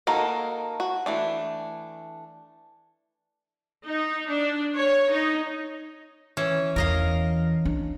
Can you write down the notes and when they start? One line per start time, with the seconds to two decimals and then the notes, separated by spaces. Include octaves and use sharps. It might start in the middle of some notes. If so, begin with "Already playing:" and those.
0.07 A#3 D#4 F#4 A4 A#4
0.80 F#4
1.06 E3 A3 D4
3.86 D#4
4.30 D4
4.75 C#5
5.10 D#4
6.37 E3 C#4
6.76 E2 E3 A#4 D#5 F5
7.65 D4